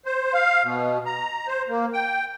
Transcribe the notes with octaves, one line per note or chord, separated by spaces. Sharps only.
C5
F5
B2
A#5
C5
A#3
G5